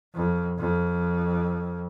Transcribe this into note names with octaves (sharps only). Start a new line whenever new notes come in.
F2
F2